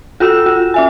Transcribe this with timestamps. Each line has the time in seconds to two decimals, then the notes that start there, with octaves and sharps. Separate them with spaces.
0.20 F4 F#4 A4 E6 E7
0.46 F4
0.74 C#4 E5 G#5